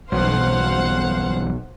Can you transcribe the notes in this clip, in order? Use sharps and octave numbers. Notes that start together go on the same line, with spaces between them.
B1 E2 G2 C5 F5 F#5